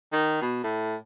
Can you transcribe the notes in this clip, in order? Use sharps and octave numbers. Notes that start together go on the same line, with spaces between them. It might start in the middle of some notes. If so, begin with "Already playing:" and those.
D#3
B2
A2